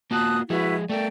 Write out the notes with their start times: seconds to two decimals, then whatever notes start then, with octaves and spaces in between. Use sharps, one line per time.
0.11 A#3 F4 F#4 A5 D#6 F#6
0.50 F3 G#3 E4 F#4 G#4 B4
0.89 A3 A4 A#4 D5 G5